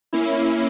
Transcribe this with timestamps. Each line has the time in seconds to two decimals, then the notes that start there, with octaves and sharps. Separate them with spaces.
0.13 A#3 C#4 E4